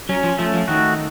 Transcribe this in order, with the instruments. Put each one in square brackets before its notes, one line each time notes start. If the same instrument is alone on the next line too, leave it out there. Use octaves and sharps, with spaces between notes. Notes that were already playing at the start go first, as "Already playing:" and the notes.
[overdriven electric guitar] F#3 [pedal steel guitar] C#4
[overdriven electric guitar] F3
[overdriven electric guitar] F3 [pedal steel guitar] A3
[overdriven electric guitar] F3
[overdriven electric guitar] D#3 [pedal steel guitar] F#4